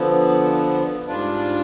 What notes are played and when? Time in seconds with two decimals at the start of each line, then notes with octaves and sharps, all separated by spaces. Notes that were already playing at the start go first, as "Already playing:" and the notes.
Already playing: D3 F3 B3
1.07 G#2 G3 D4 F4